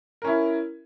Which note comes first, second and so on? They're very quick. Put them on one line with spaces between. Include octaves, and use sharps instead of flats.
A#4 C#4 E4